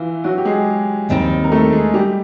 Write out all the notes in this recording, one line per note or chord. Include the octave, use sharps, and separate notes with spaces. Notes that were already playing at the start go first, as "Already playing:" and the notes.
Already playing: E3 E4 F4
F#3 F#4
G4
G#3 G#4
D#2 D#3 G3 C4 D#4
A#4
A3 A4
G#3 G#4
G3 G4